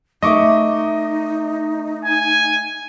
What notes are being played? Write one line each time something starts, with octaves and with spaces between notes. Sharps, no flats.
A3 D#4 D#5 E5 C#6 D6
G#5